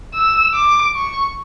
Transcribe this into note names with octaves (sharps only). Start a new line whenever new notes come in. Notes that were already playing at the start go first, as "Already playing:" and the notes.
E6
D6
C#6